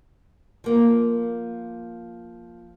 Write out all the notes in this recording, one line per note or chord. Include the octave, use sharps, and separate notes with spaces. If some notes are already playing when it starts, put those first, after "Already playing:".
F3 A#3